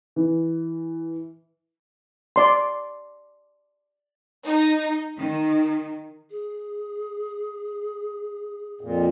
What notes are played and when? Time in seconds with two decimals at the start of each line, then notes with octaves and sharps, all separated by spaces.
0.16 E3
2.36 D5 C6
4.44 D#4
5.18 D#3
6.30 G#4
8.81 F2 A#2